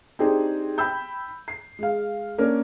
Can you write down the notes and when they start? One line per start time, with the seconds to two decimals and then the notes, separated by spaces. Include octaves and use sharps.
0.19 C4 D4 D#4 G4 G#4
0.78 G5 B5 E6 G6
1.48 C7
1.79 G#3 F5
2.38 A#3 C#4 D4 A#4